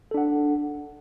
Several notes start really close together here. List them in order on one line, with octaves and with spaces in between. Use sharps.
A4 D4 F#5